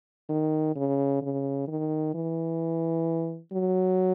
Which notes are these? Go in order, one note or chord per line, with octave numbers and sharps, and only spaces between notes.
D#3
C#3
C#3
D#3
E3
F#3